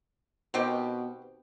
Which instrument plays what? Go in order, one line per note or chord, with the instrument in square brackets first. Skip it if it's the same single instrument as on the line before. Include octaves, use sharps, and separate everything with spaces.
[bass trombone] B2 [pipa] D#3 C4 G4